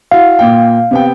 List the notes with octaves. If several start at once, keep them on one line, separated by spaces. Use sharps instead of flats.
E4 F#4 F5
A#2 A#3 G5
C3 B3 G5